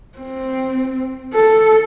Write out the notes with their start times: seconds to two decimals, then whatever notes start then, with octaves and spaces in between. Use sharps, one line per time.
0.18 C4
1.34 A4